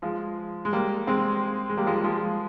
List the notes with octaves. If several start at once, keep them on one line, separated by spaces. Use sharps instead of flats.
F3 G#3
G#3
G3 A#3
G#3 C4
G#3
G3 A#3
F3 G#3
G3
F3 G#3